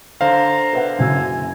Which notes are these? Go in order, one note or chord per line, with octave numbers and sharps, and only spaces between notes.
D3 C5 F5 A#5
B4 E5 F#5
F#1 F#2 G#5 E6